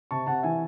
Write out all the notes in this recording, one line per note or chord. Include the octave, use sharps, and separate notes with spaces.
C3 A5 C#6
C3 F#5 A5
E3 E5 G#5